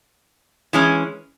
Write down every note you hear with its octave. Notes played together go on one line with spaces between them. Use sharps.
E3 G#3 C#4